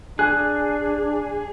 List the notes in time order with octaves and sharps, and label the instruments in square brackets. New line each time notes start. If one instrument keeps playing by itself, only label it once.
[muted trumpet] D4 [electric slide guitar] G#4 [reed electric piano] G#5 F#6